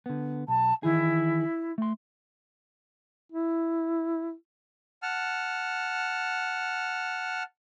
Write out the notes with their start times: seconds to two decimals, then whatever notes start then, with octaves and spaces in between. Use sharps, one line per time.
0.06 D3 B3
0.48 B1 A5
0.83 D#3 E3 E4 G#4
1.78 A3 C6
3.32 E4
5.02 F#5 A5 F6